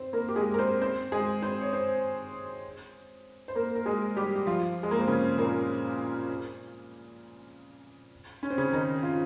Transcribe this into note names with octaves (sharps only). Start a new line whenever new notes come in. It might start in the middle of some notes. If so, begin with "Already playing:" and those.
Already playing: C4 C5
A#3 A#4
G4
G#3 G#4
A#4
C4 C5
C4 C5
G#3 G#4
C4 C5
C#5
C4 C5
C5
A#3 A#4
A#4
G#3 G#4
G3 G4
G4
F3 F4
G#3
A#3
C4
C#3 C#4
A#2 A#3
C#4
C4
C#3 C#4
D#3 D#4
F4